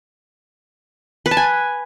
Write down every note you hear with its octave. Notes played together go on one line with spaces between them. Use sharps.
B4
A5
G#5